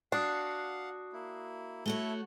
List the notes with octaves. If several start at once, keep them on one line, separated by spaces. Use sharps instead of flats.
D4 F#4 F5 F#5 D#6 F#6 C7
A#3 E4
A3 E4 F#4 A4 C#5 E5 G7